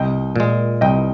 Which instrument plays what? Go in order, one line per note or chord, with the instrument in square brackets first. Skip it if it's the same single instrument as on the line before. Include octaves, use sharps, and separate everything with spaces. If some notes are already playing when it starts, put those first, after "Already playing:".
Already playing: [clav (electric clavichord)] C2 [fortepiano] D#5 G5
[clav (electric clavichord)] A#2 G#3
[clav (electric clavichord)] C2 [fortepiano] D#5 G5